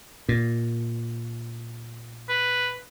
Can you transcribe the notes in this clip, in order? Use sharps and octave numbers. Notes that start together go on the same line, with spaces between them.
A#2
B4